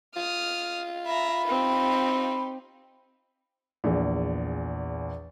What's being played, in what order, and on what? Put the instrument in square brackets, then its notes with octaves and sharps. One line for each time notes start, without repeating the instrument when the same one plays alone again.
[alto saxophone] F4 [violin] D#6 F6
[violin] E5 A#5 [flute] B5
[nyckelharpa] C4 [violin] D#4 G4
[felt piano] A#1 E2